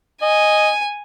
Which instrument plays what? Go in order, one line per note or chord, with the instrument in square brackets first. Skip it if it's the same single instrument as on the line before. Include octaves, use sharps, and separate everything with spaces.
[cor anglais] D#5 [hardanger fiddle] G#5